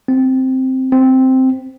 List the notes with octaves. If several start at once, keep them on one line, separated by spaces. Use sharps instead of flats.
C4
C4